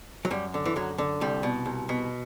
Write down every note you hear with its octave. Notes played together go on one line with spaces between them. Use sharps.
F#3
F#2 G3
D3
E3
F#2 F#3
D3
C2 G3
B2
C2
B2